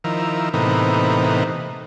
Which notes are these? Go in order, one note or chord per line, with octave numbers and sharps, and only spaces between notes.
D#3 F3 E4 A#4
A2 C3 E3 A#3 B3 D#4